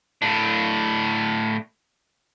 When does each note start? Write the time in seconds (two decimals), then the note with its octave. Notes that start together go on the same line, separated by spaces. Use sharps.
0.22 A2 D4